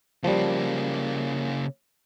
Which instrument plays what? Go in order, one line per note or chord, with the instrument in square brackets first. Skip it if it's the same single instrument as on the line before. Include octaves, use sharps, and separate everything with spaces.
[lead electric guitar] C#3 A#3 [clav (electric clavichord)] F3 G3